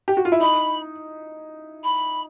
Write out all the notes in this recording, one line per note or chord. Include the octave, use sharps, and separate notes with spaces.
G4
F#4
F4
E4
D#4 B5
B5